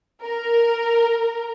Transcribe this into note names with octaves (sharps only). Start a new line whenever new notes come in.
A#4